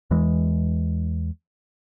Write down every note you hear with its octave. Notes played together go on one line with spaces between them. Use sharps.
E2 E3 G#3